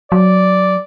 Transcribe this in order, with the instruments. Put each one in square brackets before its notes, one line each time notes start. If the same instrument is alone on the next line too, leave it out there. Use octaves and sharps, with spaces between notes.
[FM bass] F#3 [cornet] D5